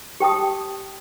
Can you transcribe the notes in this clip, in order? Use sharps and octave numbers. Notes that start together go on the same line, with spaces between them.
G4 G5 A5 D#6